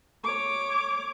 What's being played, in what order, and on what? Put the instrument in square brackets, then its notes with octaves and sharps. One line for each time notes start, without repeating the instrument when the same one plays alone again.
[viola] C#5 D6